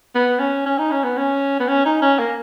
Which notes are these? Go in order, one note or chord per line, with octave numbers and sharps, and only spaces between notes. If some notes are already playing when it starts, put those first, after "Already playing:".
B3
C#4
C#4
D#4
C#4
B3
C#4
B3
C#4
D#4
C#4
A#3